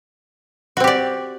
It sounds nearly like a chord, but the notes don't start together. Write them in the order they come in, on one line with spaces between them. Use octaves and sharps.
F#4 C4 G4 D5